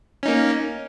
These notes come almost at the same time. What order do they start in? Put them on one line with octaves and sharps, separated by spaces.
C#4 D#4 A#3